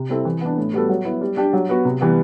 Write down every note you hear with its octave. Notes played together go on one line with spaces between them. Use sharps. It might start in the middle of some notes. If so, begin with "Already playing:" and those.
Already playing: C3
G3 C4 E4 A4
E3
B3 D4
A2
G3 B3 F#4 A4
F#3
B3 E4
G3
D4 G4
F#3
B3 F#4
C3
E3 G3 B3